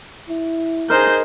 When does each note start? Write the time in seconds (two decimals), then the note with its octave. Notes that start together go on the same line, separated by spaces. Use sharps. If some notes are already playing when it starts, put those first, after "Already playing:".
0.29 E4
0.90 D#4 G#4 A#4 C5 A#5 G6